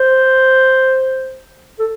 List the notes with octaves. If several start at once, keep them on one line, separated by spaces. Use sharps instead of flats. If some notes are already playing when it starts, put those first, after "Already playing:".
Already playing: C5
A4